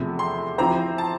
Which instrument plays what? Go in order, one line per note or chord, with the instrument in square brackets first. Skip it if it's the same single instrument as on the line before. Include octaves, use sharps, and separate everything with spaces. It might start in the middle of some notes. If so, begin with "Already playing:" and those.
Already playing: [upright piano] E2 C3 F3 A3
[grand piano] C6
[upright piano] F3 C4 E4 G4 C5 [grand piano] A#5
[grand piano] A5